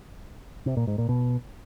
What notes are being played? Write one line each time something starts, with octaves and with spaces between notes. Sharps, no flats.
C3
A#2
G#2
A#2
B2